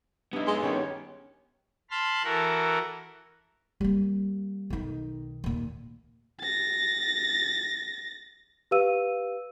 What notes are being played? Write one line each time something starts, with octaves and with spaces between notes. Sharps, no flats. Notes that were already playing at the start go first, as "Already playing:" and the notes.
G2 B3 D#4 E4
G#3
D#3 G3 C#4 C#5
A5 B5 C6 F6
E3 F#4 A4 A#4
G3 A#3
B1 D#3
D#2 A#2
A6 A#6
G4 B4 F5 E6 D#7